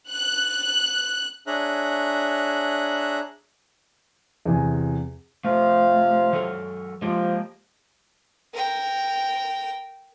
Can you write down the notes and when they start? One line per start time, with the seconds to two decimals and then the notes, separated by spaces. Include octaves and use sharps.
0.11 F#6
1.47 D4 G#4 C#5 E5 A#5 F#6
4.45 E2 C3 G#5
5.44 C3 F3 A3 F5
6.33 F#3 A4 A#4
7.02 F3 G#3 A#3 G4
8.54 A#4 G5